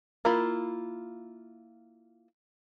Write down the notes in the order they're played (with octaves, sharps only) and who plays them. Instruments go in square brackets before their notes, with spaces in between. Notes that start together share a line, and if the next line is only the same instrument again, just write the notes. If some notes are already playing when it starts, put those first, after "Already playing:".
[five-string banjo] A#3 E4 F4 B5